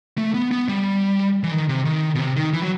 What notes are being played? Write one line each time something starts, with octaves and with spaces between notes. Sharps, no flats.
A3
B3
B3
G3
E3
D#3
C3
D#3
B2
C3
D#3
E3
F#3